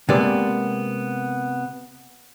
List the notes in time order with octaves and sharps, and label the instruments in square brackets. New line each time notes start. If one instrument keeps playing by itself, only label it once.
[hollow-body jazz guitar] C3 G#3 A#3 B3 D5